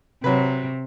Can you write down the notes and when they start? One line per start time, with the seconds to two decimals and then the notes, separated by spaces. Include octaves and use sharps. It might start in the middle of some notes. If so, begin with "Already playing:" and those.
0.24 C3 F#3 B4